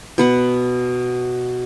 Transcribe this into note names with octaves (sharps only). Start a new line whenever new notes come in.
B2 B4 F#5